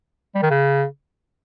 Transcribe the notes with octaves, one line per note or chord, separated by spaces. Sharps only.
G3
D#3
C#3